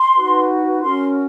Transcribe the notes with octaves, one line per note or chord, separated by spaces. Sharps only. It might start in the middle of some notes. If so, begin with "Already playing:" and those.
Already playing: C6
D#4 F#4 B4
C#4 F#4 A#4 C6